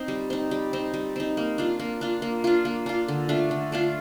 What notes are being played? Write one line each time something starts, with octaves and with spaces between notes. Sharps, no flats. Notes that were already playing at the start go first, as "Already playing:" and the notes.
Already playing: C4 D#4
G3
C4 D#4
G3
C4 D#4
G3
C4 D#4
A#3
D4 F4
A#3
D4 F4
A#3
D4 F4
A#3
D4 F4
D3
A3 D4 F4
D3
A3 D4 F4